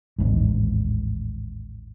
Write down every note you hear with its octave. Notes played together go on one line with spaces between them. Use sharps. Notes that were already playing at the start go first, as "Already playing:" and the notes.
A1 D#2 G#2